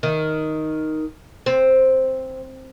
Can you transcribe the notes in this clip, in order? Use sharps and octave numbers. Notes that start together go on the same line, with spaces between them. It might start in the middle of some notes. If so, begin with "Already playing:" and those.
D#3
C4